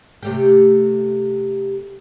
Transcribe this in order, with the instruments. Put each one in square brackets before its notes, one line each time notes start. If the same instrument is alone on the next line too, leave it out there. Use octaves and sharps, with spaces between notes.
[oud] C3 A3 G4